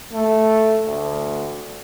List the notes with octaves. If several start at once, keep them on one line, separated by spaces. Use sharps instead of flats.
A3
D2